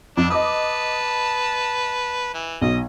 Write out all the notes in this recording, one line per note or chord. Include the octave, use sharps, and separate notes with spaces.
F2 D4
B4 D#5 A5 D6 D#6
E3
B1 D#5